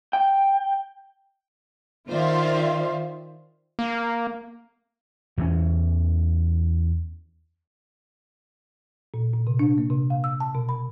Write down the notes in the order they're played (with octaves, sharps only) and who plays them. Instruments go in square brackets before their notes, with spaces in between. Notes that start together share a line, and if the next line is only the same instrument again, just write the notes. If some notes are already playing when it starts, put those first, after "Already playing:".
[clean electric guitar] G5
[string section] D#3 F4 C5 D5 E5 F5
[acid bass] A#3
[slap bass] E2 E3 G3 C#4
[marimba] A#2
A#2
C3
D4
A#3
C3
F5
E6
A5
B2
B5